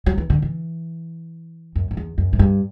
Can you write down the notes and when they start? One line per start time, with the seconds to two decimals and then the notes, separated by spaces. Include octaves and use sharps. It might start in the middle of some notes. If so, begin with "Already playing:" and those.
0.06 F#3
0.18 E3
0.30 D3
0.42 E3
1.76 F#2
1.91 F#2
1.97 E2
2.18 F#2
2.33 A2
2.39 G2